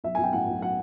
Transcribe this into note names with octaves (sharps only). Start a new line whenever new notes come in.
B1 E5
B1 G#5
G5
A2 F#5
B1
F#3 F#5